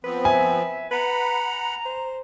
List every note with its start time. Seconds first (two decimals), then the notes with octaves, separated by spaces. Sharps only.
0.04 F3 B3 C4 B4
0.25 E5 G#5
0.91 B4 F#5 A#5 B5
1.85 C5